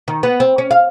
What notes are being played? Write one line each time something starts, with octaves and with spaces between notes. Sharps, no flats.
D#3
B3
C4
C#4
F5